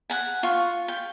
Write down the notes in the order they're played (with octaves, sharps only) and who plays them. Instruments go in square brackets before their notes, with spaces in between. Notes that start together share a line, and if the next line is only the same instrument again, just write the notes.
[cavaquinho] F#5 G#5
F4 C#6
G5